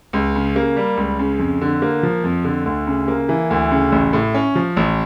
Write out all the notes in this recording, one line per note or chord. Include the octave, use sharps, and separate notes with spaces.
C#2
C#3
A#3
G3
C#2
C#3
F2
D3
A#3
F3
F2
D3
D2
C#3
A#3
E3
D2
C#3
A1
A2
C#4
F3
A1